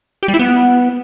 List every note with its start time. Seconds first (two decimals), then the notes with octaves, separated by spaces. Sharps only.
0.23 G4
0.28 G3
0.34 E4
0.39 B3